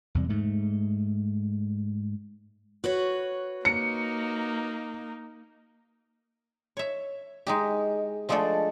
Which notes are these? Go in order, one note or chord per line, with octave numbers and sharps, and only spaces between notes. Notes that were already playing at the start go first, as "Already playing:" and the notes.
E2 C3 G3
G#2 A3
F#4 B4 C#5
A#3 D#4 C#7
C#5 E5
G#3 D#4 G4
F3 G#3 A3 D4 A4 D5